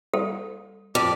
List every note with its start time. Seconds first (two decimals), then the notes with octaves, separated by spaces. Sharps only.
0.14 G3 A4
0.95 F2 G4 D5